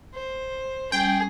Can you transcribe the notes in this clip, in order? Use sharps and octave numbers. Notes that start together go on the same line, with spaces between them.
C5
G3 C#4 G#4 G5